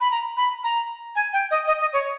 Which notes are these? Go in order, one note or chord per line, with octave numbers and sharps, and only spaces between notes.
B5
A#5
B5
A#5
G#5
G5
D#5
D#5
D#5
C#5